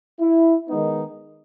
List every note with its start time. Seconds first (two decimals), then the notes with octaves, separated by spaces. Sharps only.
0.19 E4
0.69 D#3 G#3 B3 D#4